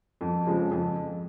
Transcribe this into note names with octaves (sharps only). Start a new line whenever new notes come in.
F2
C#3 F3 G#3
F2